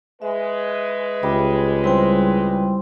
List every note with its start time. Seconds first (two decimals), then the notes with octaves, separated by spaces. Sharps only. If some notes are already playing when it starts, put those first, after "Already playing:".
0.22 G#3 B4 E5
1.23 C#2 G3
1.84 G3 C4 E4 G5